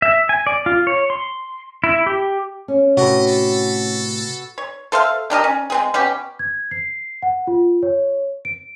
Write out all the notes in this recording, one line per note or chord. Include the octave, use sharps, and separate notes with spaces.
E5
G#5
D5
F4
C#5
C6
E4
G4
C#4
A2 C3 A3 F#4 B4 D#5
A4
C#5
A4 C5 E5 F5
D4 G4 A#4 D#5
C#4
G#3 C4 G#4
B2 C#4 G4
G#6
C7
F#5
F4
C#5
D7